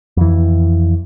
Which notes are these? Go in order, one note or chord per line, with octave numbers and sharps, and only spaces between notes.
F2 E3